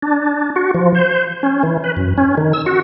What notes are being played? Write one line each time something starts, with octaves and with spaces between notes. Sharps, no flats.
D4
F#4
F3
C5
C#4
E3
B4
F#2
C#4
D#3
E6
F#4